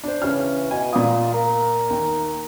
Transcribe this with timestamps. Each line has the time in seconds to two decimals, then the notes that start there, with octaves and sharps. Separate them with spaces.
0.04 D4 C5
0.22 C#3 E3 C#4 F6
0.71 B2 G#5
0.93 A#2 F4 D6 D#6
1.34 A#4
1.90 D#2